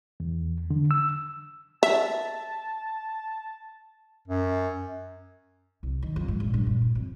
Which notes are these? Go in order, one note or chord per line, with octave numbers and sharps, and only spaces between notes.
E2
D3
E6
E5 A5
F#2
C2
D#3
F2
G#2
A#1
G2
A#2
E4
F2